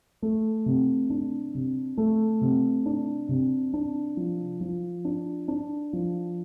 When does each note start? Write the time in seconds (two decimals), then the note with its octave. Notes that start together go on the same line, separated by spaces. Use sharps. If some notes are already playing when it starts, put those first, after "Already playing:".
0.22 A3
0.66 C3
1.10 D4
1.55 C3
1.98 A3
2.41 C3
2.86 D4
3.29 C3
3.74 D4
4.17 F3
4.61 F3
5.05 D4
5.48 D4
5.93 F3